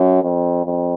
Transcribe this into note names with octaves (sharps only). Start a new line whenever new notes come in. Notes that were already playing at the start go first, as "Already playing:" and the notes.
Already playing: F#2
F2
F2